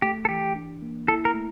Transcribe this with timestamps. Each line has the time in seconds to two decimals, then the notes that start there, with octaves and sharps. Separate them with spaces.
0.02 A3 G4
0.25 A4
0.29 E3 G4
0.55 D4
0.82 A#3
1.08 E4 A4
1.25 A#4
1.34 A3